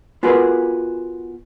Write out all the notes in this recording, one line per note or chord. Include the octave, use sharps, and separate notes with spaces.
B3 F4 F#4 G#4 A#4 B4